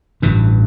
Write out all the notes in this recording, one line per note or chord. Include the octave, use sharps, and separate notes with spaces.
A1 G2 E3